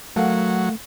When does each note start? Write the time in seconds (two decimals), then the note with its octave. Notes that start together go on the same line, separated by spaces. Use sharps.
0.16 F#3 A3 A#4 F5 F#5